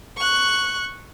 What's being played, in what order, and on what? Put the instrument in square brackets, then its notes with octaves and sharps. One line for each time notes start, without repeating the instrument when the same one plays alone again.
[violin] C#6 F#6